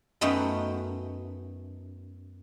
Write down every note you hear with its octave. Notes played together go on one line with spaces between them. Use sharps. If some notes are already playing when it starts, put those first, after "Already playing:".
F#2 A3 B3 D#4 G5